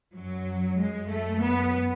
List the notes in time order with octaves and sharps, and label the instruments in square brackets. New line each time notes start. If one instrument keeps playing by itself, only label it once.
[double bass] F#2 [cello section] F#3
[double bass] F#2 [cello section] G#3
[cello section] A3
B3